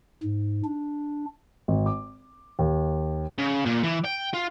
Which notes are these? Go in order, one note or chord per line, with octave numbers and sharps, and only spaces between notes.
G#2
D4
G#1
D6
D#2
C#3
A#2
E3
G5
F4